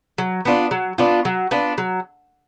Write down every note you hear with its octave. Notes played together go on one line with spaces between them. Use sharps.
F#3
B3 D4 F4
F#3
B3 D4 F4
F#3
B3 D4 F4
F#3